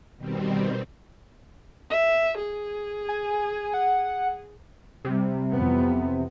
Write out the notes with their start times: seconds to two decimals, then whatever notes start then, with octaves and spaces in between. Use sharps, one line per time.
0.17 B2 D#3 G3 C4
1.90 E5
2.37 G#4
3.09 G#5
3.74 F#5
5.05 C3 G3
5.53 F2 E3 B3